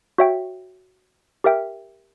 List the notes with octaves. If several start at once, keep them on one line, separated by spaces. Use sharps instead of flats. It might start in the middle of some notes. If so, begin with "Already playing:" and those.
F#4 C#5 E5 G5
G4 A#4 E5 G5